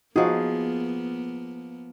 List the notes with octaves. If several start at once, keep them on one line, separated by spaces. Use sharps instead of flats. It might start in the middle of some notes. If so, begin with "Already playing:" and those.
F3 A#3 B3 D#4 F#4 G#4